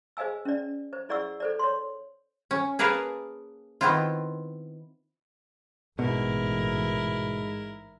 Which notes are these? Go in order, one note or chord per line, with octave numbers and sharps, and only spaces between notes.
G#4 C5 D#5 F5 G#5 E6
C#4 D5
C5
E4 G#4 D5 F#5 C#6 E6
A4 C5 D5
C#5 C6
C#4
A#3 G#4 A#4 B4 F5 A5
D#3 B3 C4 E4 F4
A1 G#2 B2 E4 A#4